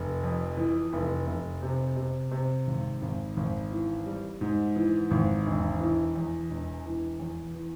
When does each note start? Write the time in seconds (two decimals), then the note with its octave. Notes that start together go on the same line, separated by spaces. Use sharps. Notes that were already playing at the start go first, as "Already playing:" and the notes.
Already playing: F1
0.23 F2
0.57 E3
0.93 F1
1.27 F1
1.63 C3
1.96 C3
2.32 C3
2.67 G#1
3.02 G#1
3.37 G#1
3.71 E3
4.06 G3
4.41 G#2
4.76 E3
5.11 G#1
5.46 E1
5.80 E3
6.16 E2
6.50 E1
6.86 E3
7.20 E2
7.55 E3